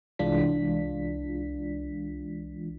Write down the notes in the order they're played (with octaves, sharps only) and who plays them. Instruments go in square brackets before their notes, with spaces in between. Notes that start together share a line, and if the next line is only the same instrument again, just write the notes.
[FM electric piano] C2 E3 G#3 D4 F4 B6